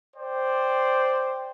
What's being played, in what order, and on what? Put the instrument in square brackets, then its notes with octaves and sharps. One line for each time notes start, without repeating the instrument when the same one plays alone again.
[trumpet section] C5 D5 G5